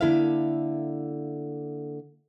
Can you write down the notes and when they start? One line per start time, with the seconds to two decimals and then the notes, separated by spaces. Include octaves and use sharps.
0.01 D3 A#3 E4 A4 E5 F5